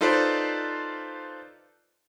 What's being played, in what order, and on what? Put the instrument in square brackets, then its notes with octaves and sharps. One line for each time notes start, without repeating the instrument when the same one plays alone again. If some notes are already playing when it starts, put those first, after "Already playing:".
[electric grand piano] D#4 F4 A4 B4 C5 D5